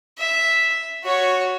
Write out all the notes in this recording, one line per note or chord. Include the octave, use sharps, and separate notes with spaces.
E5
F#4 C#5